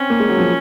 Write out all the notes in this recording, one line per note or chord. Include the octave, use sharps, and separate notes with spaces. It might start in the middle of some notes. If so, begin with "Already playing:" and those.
Already playing: C4 C#4
A#3
G#3
F#3
F3